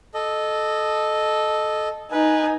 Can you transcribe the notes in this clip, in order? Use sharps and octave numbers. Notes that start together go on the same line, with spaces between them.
A4 D#5
D#4 B4 G#5